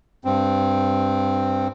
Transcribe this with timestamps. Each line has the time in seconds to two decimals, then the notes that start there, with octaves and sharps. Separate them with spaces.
0.25 G2 C4